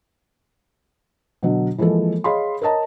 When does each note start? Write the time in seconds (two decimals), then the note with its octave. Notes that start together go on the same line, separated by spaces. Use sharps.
1.43 B2 D3 F#3
1.78 E3 F3 G#3 A#3 A4
2.24 G#4 C#5 D#5 F5 B5 C6
2.61 A#4 C#5 D#5 A5 A#5